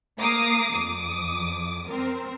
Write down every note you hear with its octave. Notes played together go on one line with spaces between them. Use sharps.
A#3 A#5 D6 D#6 C7
F2 D6 D#6
C4 A#4